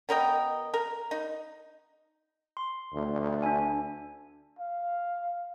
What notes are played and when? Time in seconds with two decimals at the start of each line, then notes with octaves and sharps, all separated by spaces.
0.09 B2 A#4 D#5 G5
0.74 A#4
1.11 D#4
2.57 C6
2.94 D2
3.43 D4 G#5
4.59 F5